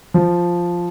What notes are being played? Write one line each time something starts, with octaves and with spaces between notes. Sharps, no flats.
F3